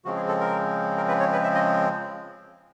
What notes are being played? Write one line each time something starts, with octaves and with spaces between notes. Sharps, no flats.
C#3 F3 G#3 C4 F#4
G#4
A4
A#4
A#4
B4
C#5
B4
E5
D#5